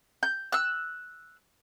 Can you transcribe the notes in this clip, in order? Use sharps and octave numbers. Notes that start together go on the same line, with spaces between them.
G6
E6 F#6